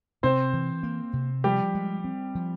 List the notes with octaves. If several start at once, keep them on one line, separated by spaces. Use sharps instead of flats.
C3 C4 C5
E3
A#3
C3
F3 G3 G4
G#3
C4
F3